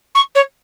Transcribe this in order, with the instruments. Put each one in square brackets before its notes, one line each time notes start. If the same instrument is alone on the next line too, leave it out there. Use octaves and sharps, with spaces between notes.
[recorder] C#6
C#5